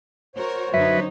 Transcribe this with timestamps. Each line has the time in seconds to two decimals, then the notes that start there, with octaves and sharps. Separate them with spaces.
0.36 F#4 A#4 C5 C#5
0.74 F#2 D3 F#3 D#4 B4 E5